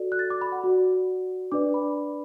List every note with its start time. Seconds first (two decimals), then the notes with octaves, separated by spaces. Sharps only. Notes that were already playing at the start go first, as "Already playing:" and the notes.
Already playing: F#4 A4 D5
0.12 F#6
0.19 A6
0.30 D6
0.41 B5
0.52 F#5
0.64 F#4 D5
1.52 D4 B4 D5 D6
1.74 B5